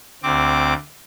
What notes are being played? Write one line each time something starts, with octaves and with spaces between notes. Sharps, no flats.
D2 C4 D6